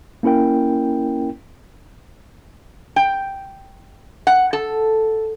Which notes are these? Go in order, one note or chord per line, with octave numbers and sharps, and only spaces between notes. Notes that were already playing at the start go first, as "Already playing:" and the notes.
A#3 C#4 E4 A#4 G5
G5
F#5
A4